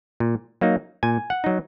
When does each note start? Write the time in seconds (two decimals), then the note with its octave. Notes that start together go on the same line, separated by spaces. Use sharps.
0.20 A#2
0.61 F#3 A#3 D#4
1.03 A#2 G#5
1.30 F#5
1.44 F#3 D#4